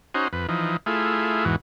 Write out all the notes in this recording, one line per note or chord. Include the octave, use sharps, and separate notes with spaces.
C#4 D#4 F#4 C5
F2 B4
E3 F3 D#4
A3 E4 F4 G#4
E2 G#2 E3 F#4